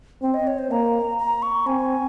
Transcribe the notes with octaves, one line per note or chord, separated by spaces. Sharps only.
C4 C5
D#5
C#5
C5
A#3 A#5
A#5
C#6
C4 G#5